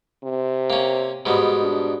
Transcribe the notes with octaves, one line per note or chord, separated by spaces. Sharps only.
C3
A#3 C#4
G#2 B2 G3
D4